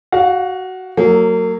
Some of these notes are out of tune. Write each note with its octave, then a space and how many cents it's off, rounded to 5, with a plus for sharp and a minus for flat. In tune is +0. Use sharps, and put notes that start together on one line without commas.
F#4 +10 F5 +35
F#3 +0 A#3 -35